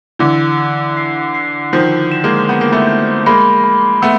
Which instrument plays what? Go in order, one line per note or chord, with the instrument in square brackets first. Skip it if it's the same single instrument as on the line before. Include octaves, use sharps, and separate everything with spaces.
[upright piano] D3 E3 [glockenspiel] E6
[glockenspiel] E6
C7
C7
[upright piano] D#3 F3 [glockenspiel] G6
[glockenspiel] E7
[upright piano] G#3 A#3
[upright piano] B3 [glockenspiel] G6
[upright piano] A#3
A3 B3
[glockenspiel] G6
[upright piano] G#3 A#3 [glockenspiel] B5
[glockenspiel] B5
[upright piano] A3 B3 [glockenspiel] E6